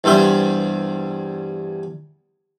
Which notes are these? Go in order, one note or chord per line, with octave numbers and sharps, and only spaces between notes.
E2 G2 G3 C5 E5